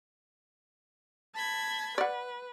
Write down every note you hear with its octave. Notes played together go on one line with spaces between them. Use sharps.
A5 B5 G#6
B4 D5 F#5